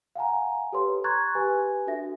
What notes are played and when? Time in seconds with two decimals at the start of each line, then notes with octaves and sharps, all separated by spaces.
0.15 F5 F#5 G#5 A#5
0.72 G4 A4 B4 C#5 C6
1.04 A#5 C6 C#6 F#6 G#6 A6
1.35 G4 B4 G#5
1.87 D4 F#4 A4 E5 A#6